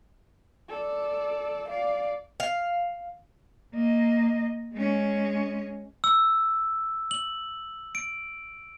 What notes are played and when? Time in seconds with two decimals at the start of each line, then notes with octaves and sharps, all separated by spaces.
0.69 A4 D5
1.69 D5 F5
2.40 F5
3.74 A#3 D#5
4.74 G#3 C#4
6.04 E6
7.11 F#7
7.95 D7